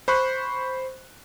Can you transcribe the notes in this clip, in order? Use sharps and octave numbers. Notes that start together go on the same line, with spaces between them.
C5 B5 C#6 F#6